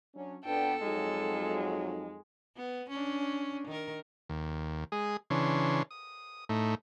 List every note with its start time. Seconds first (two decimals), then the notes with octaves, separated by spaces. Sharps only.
0.15 F#3 C#4 D4
0.45 F2 B3 D4 A4 G5
0.83 F2 F#3 G#3 D#4
2.57 B3
2.90 C#4 D4
3.67 D#3 A#4
4.30 D#2
4.92 G#3 G#4 D#6
5.30 C#3 E3 D4 C#5 C6
5.91 D#6
6.49 A2 A3 D#4